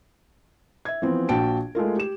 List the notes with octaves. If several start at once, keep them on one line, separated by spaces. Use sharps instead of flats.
E5 G#6
E3 F3 B3 C4
A#1 F#4 G5 A5 D7
G#3 A3 F4 A#4
G4 E7